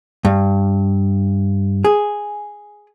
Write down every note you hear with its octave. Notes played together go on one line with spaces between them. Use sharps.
G2
G#4